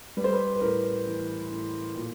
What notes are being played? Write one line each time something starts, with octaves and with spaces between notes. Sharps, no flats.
G3 B4
C5
B4
B4
A2 A#4
E3
A2
A#2